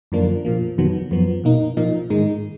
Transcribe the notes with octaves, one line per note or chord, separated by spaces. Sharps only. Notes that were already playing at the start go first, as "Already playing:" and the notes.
F#2 D3 F3 A#3 D4
A#2 F3 A#3
F2 D#3 F#3 B3
F#2 F3 B3
B2 A#3 D#4
A#2 F3 A#3 D#4
G#2 D#3 G#3 D#4